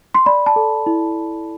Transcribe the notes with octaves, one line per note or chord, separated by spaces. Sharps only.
C6
D5 B5
A5
A4
E4